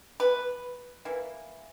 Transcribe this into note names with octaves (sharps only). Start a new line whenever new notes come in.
B4
E3 A#3